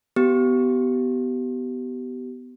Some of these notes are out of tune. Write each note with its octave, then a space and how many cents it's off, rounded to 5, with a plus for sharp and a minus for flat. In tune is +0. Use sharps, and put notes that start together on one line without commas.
B3 +15 G4 -30